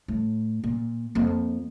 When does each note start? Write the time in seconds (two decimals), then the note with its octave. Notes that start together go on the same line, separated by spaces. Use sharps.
0.08 A2
0.64 A#2
1.15 F2 A#3